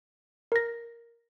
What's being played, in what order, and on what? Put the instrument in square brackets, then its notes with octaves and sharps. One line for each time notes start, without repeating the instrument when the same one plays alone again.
[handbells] A#4 A#6